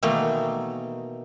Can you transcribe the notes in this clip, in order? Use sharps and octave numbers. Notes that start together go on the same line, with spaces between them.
B2 D#3 E3 A3 A#3 D#4